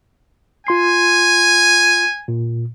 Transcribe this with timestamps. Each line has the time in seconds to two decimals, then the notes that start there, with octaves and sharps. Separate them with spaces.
0.67 F4 G#5 C6 C7
2.28 A#2